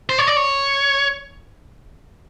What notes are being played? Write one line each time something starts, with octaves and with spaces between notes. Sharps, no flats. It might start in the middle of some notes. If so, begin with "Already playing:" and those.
C5
C#5
D5
C#5